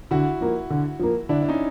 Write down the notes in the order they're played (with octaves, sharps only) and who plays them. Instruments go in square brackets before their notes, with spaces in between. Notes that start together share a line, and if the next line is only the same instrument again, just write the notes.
[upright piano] D3 [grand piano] E4 F#4
[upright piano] F3 A#3
D3
F3 A#3
[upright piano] D3 [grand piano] D4 E4
[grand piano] D4
C#4 D#4